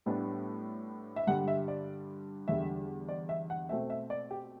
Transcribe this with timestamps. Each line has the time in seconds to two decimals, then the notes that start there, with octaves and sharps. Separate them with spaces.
0.06 A2 G3 B3 D4
1.16 E5
1.27 G2 D3 G3 F#5
1.48 E5
1.68 D5
2.48 E2 D3 G3 E5
3.09 D5
3.29 E5
3.50 F#5
3.69 B2 A3 C4 E5
3.90 E5
4.10 D5
4.31 G4